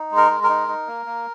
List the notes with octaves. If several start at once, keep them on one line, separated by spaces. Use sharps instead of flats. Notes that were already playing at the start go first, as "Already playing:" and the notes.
Already playing: D#4
G#3
A#4
G#3
A#4
D#4
D#4
A#3
A#3